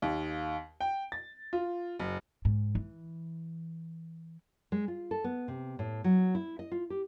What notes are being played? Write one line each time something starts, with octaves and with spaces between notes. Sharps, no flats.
D#2
G5
A6
F4
F#1
G#2
E3
G#3
F4
A4
B3
C3
A2
F#3
E4
D#5
F4
G4